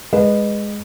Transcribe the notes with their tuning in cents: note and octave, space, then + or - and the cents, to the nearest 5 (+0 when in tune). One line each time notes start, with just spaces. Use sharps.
G#3 +0 B4 +0 D#5 -25